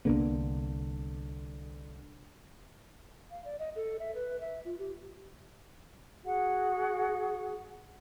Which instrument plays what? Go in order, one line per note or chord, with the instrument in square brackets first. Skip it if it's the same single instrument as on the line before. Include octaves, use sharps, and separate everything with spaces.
[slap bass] C2 A#3 B3 [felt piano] D3
[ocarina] F5
D5
D#5
A4
E5
B4
E5
F4
G4
[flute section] F#4 G#4 F#5